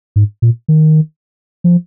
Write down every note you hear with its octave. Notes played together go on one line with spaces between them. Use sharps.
G#2
A#2
D#3
F3